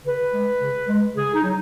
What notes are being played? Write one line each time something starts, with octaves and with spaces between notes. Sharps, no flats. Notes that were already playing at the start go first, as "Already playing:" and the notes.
C#3 B4
G#3
C#3
G#3
C#3 G#4
D#4
F#3